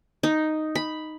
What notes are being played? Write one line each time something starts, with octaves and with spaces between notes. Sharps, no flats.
D#4
B5